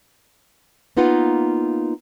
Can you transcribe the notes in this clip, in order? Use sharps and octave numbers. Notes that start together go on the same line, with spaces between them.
A#3 B3 D#4 F4 B4 F#5